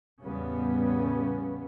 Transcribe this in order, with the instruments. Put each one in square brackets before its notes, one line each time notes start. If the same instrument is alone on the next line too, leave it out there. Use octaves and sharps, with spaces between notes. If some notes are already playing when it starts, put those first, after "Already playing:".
[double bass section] E2 A2 C#3 G3 B3 C#4